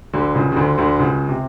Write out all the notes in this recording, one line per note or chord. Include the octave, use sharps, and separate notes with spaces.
D2 D3
C#2 C#3
C#3
D2 D3
D2 D3
C#2 C#3
C3